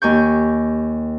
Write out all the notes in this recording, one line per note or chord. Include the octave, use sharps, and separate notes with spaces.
D#2 G#5 C#6 G6